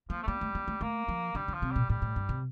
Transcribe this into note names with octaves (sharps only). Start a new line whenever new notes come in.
F3 A#3
A3
G3 A#3
A3
A#3
A3
A3 A#3
F3
D3 G3
D3
F3
C3
A#2 G3
A2 G3
A2
G2
C3